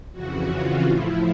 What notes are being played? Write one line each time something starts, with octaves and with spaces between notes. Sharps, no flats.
F2 C#3 E3 F#4
F4
A2 F3 E4